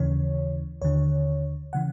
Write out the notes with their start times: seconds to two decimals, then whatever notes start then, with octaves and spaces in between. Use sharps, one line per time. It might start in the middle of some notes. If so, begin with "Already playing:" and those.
Already playing: D#2 C#3 E3 C#5
0.82 D#2 D3 C#5
1.73 C#3 E3 F#5